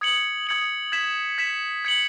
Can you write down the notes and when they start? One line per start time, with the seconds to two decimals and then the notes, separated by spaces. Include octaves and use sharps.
0.01 D#6 G#6 C#7 F#7
0.47 D#6 G#6 C#7 F#7
0.92 G#6 B6 E7
1.38 G#6 B6 E7
1.85 G#6 C#7 F#7